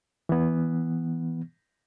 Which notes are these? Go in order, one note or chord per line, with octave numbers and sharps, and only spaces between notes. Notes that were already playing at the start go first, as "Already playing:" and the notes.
E3 B3